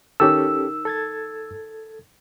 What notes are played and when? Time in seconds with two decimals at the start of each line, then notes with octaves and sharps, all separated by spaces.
0.20 D#3 C#4 G4 A4 E6
0.85 A4 G#6 A6